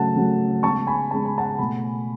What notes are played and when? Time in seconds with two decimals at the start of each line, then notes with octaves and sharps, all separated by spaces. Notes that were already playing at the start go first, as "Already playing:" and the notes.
Already playing: C#3 F#3 A3 F#5 A5
0.16 C#3 F#3 A3
0.63 C#3 G#3 B3 A5 C#6
0.87 G#5 B5
1.11 C#3 G#3 B3 A5
1.25 B5
1.38 F#5 A5
1.59 B2 A3 G#5 B5